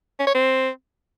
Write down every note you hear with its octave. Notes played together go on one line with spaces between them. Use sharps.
C#4
C#5
C4